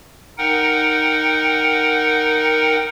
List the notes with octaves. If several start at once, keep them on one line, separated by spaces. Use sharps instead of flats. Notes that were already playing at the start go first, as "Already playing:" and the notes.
D#4 A#4 F#5 G5